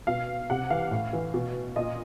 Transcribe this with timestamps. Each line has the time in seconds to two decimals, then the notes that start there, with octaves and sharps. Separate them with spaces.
0.07 B2 F5
0.50 C3 F#5
0.70 E3 F5
0.91 A2
1.13 E3
1.34 B2
1.76 A#2 D#5